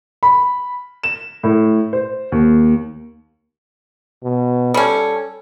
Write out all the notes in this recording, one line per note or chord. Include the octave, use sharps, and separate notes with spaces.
B5
E7
A2
C5
D#2
B2
G3 C#4 A4